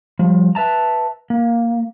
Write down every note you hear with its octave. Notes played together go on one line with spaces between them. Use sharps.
F3 G3
B4 E5 A5 A#5
A#3